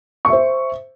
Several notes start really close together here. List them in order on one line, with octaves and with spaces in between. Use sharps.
C#6 E5 C5